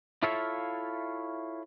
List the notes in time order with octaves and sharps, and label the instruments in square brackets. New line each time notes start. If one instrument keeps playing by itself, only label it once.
[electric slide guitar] E4 F4 A4 C#5 E5 F5